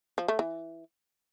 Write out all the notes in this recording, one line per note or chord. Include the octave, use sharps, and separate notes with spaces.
F3
A3
E3